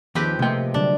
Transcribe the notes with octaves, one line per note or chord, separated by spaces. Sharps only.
D#2 F3 C4 G4 G#4 B4
C3 A3 A#3 D#5 G5
D3 F#3 G3 D4